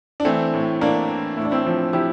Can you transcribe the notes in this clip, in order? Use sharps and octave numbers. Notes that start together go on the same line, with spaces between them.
D4
E3 A3 C4
A2
A2 A#3 D4
E3
A2 E4
D4
C4 E4
F3
F3 E4 G4